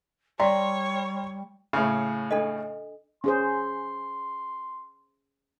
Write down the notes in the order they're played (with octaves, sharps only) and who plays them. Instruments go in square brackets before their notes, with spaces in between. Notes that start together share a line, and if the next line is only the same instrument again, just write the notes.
[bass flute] G3 [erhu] C#5 [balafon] D5 G5 [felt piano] A#5 C6
[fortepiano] A2 C#3
[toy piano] D4 A4 D#5
[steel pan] C#4 G#4 C5 [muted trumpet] C6